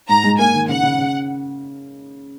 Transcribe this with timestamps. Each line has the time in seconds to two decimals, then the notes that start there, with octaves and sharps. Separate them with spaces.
0.09 G#2 A#5
0.24 G#3
0.39 A#3 G#5
0.54 D#3
0.68 C#3 F#5
0.83 C#3
0.98 C#3